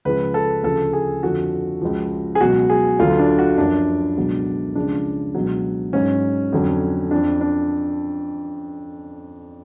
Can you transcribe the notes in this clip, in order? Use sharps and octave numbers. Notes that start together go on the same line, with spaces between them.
C#2 C#3 F3 B4
A4
D2 C#3 F3 A4
G#4
F2 D3 F3 F#4
C#2 C#3 F3
G#4
C#2 B2 F#3 F#4
G#4
D2 D3 F#3 F4
D4
F#4
F#2 F3 D4
C#2 B2 F#3
C#2 C#3 F3 D4
C#2 B2 F#3
G#2 F#3 C#4
F2 D3 F#3
F2 F3 D4
D4